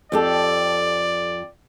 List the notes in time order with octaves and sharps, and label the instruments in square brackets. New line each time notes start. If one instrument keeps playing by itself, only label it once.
[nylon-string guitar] F2 G4 A4 [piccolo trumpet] D5